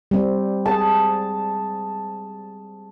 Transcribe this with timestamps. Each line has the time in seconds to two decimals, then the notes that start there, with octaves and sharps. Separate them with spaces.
0.11 G3 C4
0.66 G#4 A5